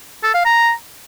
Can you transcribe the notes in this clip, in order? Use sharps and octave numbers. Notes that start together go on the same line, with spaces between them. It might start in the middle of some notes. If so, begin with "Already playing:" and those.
A4
F5
A#5